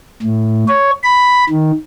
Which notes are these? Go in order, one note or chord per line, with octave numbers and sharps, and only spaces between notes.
A2
C#5
B5
D#3